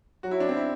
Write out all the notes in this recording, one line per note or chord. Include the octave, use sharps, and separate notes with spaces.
F#3 F#4
E4
D4
C4
E4